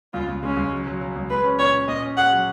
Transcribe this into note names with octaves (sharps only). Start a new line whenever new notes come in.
C#2 F4
C#2
G#3 C#4
C#2
F#3
F#3
F#3
C#2
G#3 B4
C#4
A#2 C#5
C#4
A#2 D#5
C#4
G#4 F#5
F#3